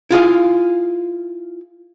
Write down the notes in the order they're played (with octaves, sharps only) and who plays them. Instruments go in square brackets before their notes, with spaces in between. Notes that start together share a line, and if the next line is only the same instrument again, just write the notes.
[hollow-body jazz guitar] E4 F4 G#4 F5